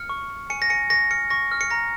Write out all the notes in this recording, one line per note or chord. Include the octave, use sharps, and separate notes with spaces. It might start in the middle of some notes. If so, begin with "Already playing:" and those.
Already playing: F6 C#7
C#6
C#6
G#5 C#7
A#6
G#5 C#7
C#6 A#6
F6 C#7
C#6 A#6
F6
C#7
A#5 A#6